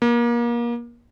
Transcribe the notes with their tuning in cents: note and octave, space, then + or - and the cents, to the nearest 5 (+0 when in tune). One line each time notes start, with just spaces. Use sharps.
A#3 +30